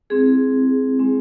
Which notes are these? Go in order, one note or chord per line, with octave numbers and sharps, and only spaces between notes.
G#3 C4 E4 G#4
G#3 C4 E4